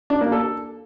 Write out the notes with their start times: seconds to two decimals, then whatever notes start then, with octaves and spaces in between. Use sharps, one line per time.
0.10 D4
0.21 A#3
0.32 A4